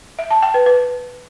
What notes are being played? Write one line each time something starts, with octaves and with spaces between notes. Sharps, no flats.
E5
A5
G5
B4
B4